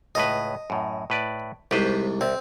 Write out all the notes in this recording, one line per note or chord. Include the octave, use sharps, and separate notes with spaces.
C#2 A2 B4 D#5
F#2 A2
A2 B4 D5
C2 G#2 G4 B4 C5
C2 C4